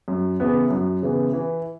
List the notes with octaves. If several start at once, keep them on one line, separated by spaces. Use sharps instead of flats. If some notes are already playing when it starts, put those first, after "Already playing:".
F#2
C#3 E3 B3
F#2
C#3 E3 B3
E3